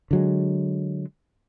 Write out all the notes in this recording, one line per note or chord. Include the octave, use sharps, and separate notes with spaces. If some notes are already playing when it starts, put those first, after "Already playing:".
D3 F#3 G#3